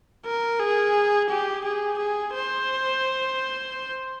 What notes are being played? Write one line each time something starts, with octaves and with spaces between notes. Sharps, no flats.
A#4
G#4
G4
G#4
G#4
C5